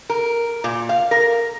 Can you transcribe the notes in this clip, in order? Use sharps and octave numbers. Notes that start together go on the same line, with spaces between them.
A#4
A#2
F5
A#4